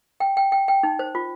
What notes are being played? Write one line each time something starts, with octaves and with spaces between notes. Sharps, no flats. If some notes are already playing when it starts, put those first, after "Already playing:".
G5
G5
G5
G5
D#4
C5
F4